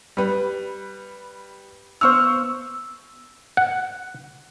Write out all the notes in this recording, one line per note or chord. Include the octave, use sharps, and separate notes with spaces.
G3 B4
B3 C5 C#6 E6 F6
F#5